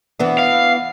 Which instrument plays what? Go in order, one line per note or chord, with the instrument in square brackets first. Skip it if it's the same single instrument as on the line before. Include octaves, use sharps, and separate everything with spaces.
[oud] E3 B3 D4
[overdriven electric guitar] F5